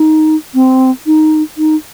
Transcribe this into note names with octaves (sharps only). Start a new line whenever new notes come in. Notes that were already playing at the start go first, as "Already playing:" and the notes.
Already playing: D#4
C4
D#4
D#4